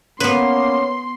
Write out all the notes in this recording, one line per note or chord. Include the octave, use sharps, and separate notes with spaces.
A#3 B3 C#4 B4 C6